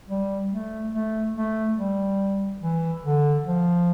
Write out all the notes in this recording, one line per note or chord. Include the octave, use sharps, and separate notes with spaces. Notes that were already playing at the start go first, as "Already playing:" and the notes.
G3
A3
A3
A3
G3
E3
D3
F3